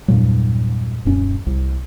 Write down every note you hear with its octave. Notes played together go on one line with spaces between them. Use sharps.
E2 G2 A#2 F#3
D#1 F#2 C#4
C2